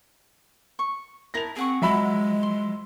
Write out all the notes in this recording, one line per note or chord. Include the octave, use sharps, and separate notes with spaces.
C#6
E4 A#4 A5 A#6 F7
C4 G#4 F#5 C#6
F3 F#3 G#3 E5 B5
C6